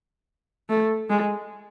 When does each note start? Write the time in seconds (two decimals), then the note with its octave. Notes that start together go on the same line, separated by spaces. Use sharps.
0.70 A3
1.10 G#3